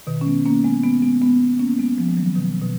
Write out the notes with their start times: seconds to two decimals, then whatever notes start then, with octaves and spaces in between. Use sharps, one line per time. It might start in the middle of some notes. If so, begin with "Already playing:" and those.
0.07 B2 D#3
0.21 C#4
0.26 G#3 B3
0.45 A#3 C#4
0.64 G#3 B3
0.84 G#3 B3
1.02 G#3 B3
1.21 G#3 B3
1.59 A#3 C#4
1.78 G#3 B3
1.98 F3 G#3
2.08 G#3
2.17 D#3 F#3
2.36 B2 D#3
2.62 B2